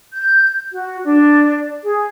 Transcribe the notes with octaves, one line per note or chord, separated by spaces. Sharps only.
G6
F#4
D4
G#4